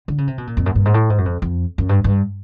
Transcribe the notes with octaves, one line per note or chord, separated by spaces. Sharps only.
D3
C#3
C3
B2
A#2
F2
F#2
G2
G#2
A2
G#2
F#2
F2
F2
F#2
G2
G2